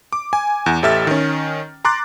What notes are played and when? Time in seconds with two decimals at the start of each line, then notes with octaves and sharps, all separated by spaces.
0.13 D6
0.33 G#5
0.66 E2
0.83 A1 G4 A4 E5 F6 A6
1.07 D#3 C#4
1.85 A#5 C6 D6 F#6 A6